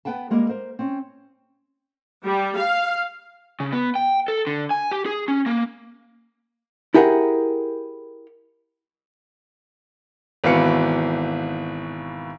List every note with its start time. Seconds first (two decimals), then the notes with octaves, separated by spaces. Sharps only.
0.05 B3 B4 F#5 G5 A5
0.30 G3 G#3 A#3 A#4
0.49 A#4 C5
0.79 C4 C#4
2.24 G3
2.57 F5
3.60 C#3
3.73 B3
3.96 G5
4.28 A4
4.47 D3
4.70 G#5
4.91 G4
5.06 G#4
5.28 C#4
5.46 A#3
6.94 E4 G4 G#4 A#4 F#5
10.44 G#1 B2 E3 B4 F5 C#7